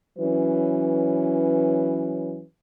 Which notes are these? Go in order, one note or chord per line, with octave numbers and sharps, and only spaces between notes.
E3 F#3 C#4 B4